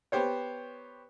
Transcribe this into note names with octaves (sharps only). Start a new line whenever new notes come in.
B3 G4 C5 C#5